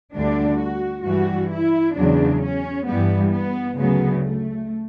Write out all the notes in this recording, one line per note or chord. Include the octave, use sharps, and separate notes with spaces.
D2 D3 G3 D4
F#4
G2 E3 G3 F#4
E4
E2 C#3 F#3 D4
C#4
G2 E3 G3 B3
B3
D2 C#3 F#3 B3
A3